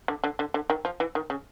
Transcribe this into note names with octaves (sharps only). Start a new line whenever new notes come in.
D3
D3
D3
D3
D#3
F3
E3
D#3
C#3